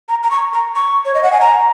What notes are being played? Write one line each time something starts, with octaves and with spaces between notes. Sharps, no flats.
A#5
A#5
C#6
A#5
C#6
C#5
D#5
F#5
G#5
A#5